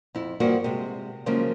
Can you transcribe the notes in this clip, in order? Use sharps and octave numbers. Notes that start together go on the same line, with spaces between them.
F2 E4
G2 F3 A#3 F#4
C3 G#3
C#3 F3 F#3 G#3 A#3